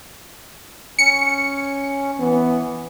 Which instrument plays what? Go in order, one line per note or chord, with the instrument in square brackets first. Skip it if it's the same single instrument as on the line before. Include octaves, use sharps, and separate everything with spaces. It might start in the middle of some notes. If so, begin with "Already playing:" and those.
[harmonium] C#4 [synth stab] C#7
[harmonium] E3 [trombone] B3